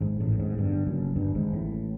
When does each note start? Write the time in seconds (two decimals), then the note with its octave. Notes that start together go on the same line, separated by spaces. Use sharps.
0.01 G#1 G#2
0.20 A1 A2
0.39 G#1 G#2
0.58 G1 G2
0.87 F#1 F#2
1.16 G1 G2
1.35 G#1 G#2
1.53 A1 A2